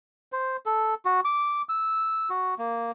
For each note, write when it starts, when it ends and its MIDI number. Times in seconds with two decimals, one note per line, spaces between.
0.32 0.57 72
0.66 0.94 69
1.05 1.20 66
1.25 1.62 86
1.69 2.29 88
2.30 2.55 66
2.58 2.91 58